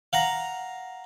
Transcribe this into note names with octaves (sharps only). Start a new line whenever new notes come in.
F5 F#5 A#5